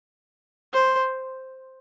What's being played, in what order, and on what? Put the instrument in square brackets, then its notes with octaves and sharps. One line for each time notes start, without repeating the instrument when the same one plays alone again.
[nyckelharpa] C5